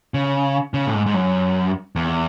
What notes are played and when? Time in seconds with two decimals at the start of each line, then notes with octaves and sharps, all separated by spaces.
0.14 C#3
0.74 C#3
0.87 A2
0.94 G#2
1.06 G#2
1.14 F#2
1.96 E2